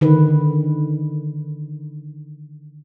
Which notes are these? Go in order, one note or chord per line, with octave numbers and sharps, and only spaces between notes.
D3 D#3 B4